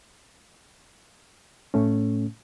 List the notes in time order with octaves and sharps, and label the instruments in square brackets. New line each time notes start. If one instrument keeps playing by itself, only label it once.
[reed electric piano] A2 A3 C#4